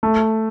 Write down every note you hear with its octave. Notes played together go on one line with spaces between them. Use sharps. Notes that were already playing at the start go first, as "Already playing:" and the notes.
A3